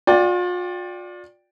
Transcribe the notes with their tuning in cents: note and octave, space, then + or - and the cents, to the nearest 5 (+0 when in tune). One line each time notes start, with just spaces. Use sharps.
F4 +40 D5 +0 G5 +0